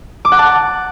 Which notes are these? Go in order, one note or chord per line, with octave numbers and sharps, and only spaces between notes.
D6
F#5
A5